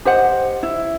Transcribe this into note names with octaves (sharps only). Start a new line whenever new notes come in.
G4 C5 D#5 F#5
E4